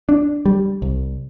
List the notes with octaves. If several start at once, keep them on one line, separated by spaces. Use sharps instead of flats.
D4
G3
C2